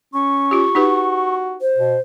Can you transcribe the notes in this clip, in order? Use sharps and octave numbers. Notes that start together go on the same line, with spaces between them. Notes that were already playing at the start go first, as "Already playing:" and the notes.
C#4 C#6
F4 G4
D#4 F#4 G4 B4
C5
B2